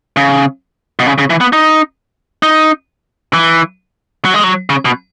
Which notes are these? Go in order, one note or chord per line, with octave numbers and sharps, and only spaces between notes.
C#3
B2
C#3
C#3
E3
B3
D#4
D#4
E3
F#3
G#3
F#3
C#3
B2